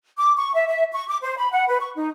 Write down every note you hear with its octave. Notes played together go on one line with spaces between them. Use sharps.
D6
C#6
E5
E5
C#6
D6
C5
B5
F#5
B4
C#6
D#4